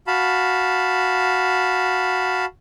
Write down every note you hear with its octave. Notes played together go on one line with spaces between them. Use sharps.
F#4 F5 A5 B5